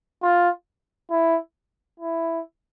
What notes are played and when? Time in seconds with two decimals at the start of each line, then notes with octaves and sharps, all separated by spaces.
0.23 F4
1.11 E4
2.00 E4